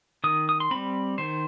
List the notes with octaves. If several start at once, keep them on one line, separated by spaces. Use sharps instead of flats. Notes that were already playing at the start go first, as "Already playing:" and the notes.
D#3 D#6
D#6
C6
G3 C4 B5
D#3 C5